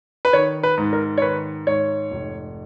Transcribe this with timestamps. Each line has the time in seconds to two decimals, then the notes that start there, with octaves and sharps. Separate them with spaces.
0.25 B4
0.33 D#3 C#5
0.63 B4
0.78 G#2
0.93 A#4
1.18 C#5
1.22 D#3 B4
1.67 G#2 C#5
2.12 F1